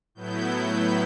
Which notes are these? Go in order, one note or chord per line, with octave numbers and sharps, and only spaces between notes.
A2 F#3 B3 E4 G6